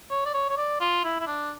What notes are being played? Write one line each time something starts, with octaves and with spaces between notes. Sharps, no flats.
C#5
D5
C#5
C#5
D5
F4
E4
E4
D4